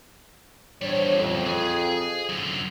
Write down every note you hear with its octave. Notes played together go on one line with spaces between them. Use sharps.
E2 G3 D4 C5 C#5
F2
G#4 G#5
F#2 D3